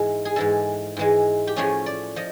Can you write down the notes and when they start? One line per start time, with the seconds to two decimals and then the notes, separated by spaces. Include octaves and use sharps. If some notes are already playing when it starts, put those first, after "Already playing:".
Already playing: G#2 E3 G#3
0.25 G#4
0.36 G#2 E3 G#3 A4
0.97 G#2 E3 G#3
1.47 G4
1.56 A2 F3 A3 C#4 G#4
1.86 D5
2.16 F3 D#5